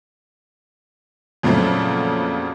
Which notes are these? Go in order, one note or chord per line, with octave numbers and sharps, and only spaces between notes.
F2 A#2 C#3 F#3 A3 C4